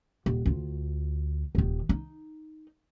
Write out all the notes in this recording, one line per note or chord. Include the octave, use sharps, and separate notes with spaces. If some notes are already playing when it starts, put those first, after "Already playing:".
D#1
D2 F4
D#1 D#3
D#4